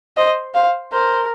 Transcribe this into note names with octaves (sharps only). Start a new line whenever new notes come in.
C5 D#5
C5 F5
A#4 C5